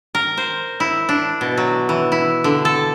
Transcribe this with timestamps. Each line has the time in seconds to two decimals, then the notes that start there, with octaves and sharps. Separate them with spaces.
0.15 A#4
0.37 C5
0.80 E4
1.09 D4
1.41 B2
1.57 F#3
1.89 E3
2.12 E4
2.44 D3
2.65 A4